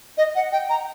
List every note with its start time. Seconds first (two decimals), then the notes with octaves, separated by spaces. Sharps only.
0.18 D#5
0.35 F#5
0.52 G5
0.70 A#5